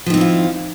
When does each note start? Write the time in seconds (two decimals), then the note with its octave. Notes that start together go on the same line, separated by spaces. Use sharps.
0.06 F3
0.10 D#3
0.14 C4
0.17 E4
0.21 F4